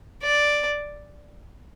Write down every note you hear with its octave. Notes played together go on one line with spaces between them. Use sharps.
D5